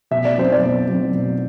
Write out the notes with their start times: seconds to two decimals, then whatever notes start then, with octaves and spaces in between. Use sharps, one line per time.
0.11 B2 E5
0.25 D5
0.37 F#3 C4 C5
0.52 D5
0.62 B2
0.88 F#3 C4
1.13 B2